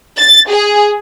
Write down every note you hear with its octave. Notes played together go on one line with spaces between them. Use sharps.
A6
G#4